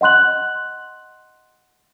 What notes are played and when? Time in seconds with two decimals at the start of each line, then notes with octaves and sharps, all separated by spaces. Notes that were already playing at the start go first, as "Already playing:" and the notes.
0.01 D#5 F#5 C6 F#6 F#7